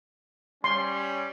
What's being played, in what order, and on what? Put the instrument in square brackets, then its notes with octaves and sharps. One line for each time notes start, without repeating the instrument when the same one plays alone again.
[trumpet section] G3 C#4 C#5 [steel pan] C6